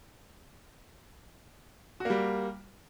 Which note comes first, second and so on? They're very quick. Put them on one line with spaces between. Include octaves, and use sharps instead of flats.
F#4 A#3 G3